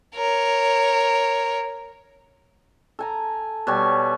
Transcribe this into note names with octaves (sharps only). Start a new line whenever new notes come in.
A#4 C#5
A4 G#5 A#5
B2 G3 C#5 G#5